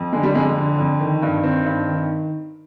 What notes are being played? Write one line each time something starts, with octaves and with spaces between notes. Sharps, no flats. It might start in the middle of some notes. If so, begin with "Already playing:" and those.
Already playing: F2
D3 G#3
G3
F2 G#3
D3
F2
D#3
G2
D#3 C4
G2
D#3